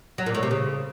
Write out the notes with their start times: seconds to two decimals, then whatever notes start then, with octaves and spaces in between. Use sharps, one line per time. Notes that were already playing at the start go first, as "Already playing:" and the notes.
0.18 F#3
0.26 A#2
0.35 A2
0.43 C3
0.51 C#3